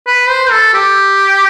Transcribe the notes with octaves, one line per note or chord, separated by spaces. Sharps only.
B4
C5
A4
G4